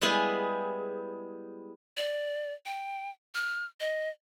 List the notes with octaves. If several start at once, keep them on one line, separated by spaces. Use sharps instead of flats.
G3 G#3 B3 E4 G#4
D5
G5
F6
D#5